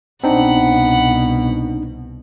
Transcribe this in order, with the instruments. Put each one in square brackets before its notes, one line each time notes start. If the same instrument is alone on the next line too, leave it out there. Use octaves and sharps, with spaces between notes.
[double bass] C2 B2 [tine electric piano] C4 D4 D#4 [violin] F#5 B5